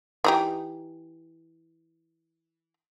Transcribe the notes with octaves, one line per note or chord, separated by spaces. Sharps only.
E3 D#4 G4